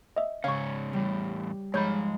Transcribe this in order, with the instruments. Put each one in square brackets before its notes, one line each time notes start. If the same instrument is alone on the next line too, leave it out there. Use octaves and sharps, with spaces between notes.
[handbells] D#5 E5
[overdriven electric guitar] G#2 C#4 [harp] C#3 C#5 [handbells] F5 C#6
[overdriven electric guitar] E2 A2 [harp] G3
[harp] G#2 F3 [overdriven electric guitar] G#3 B5 [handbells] C#5 G6